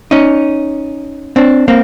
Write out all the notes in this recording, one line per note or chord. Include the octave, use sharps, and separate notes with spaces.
C#4 D#4
C4 D4
A#3 C4